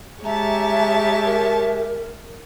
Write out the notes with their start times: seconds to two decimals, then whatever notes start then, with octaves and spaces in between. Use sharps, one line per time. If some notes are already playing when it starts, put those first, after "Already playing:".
0.24 G#3 G4 C#5 E5 A5 A#5
1.25 A#4